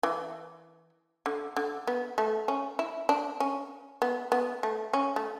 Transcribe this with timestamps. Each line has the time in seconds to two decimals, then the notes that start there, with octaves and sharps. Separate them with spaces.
0.03 E3
1.26 D3
1.56 D3
1.87 B3
2.18 A3
2.48 C#4
2.79 E4
3.09 D4
3.40 C#4
4.02 B3
4.32 B3
4.63 A3
4.93 C#4
5.16 A3